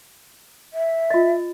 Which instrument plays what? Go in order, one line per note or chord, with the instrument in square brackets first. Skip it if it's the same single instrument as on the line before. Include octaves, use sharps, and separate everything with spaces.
[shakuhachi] E5
[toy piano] F4 D#5